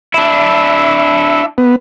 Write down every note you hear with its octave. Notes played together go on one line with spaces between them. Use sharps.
D4 E4 E5
B3